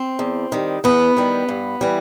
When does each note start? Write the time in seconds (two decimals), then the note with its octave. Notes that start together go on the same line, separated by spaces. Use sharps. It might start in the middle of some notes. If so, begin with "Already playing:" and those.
Already playing: C4
0.19 E2
0.52 D#3 G3
0.84 E2 B3
1.17 D#3 G3
1.49 G2
1.81 E3 G3